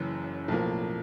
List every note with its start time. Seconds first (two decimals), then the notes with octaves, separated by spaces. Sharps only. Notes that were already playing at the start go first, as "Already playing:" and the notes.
Already playing: F#1 F#2 C#3 E3
0.48 B1 A2 F3 A#3